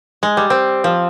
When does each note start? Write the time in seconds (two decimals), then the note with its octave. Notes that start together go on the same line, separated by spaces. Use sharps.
0.23 G#3
0.37 G3
0.50 C4
0.84 F3